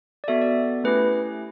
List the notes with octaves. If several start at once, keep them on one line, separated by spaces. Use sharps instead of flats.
D5
B3 F#4 A4 E5
D5
A3 C#4 E4 G4 B4